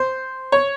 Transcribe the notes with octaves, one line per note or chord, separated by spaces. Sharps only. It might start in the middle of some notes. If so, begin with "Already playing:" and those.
Already playing: C5
C#5